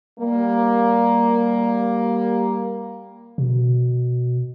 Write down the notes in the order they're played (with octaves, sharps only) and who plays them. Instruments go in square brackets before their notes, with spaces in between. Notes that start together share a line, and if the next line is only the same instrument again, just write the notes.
[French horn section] G3 A#3
[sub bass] B2